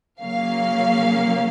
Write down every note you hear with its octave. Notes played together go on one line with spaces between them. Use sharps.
C#3 F#3 A#3 C#4 F5